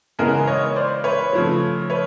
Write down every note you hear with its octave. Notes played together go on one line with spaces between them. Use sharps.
C#3 E3 G#3 B3 G#4 A#4
C#5 D#5
C5 D5
B4 C#5
C#3 F3 A3
B4 C#5